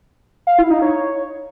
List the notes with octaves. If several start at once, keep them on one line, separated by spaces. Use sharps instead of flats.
F5
E4
D#4
C#5